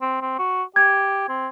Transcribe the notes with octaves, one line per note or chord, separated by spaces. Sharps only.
C4
C4
F#4
G4 G#6
C4